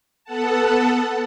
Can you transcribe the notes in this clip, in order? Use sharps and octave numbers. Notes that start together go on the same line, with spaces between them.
B3 A4 F#5 A5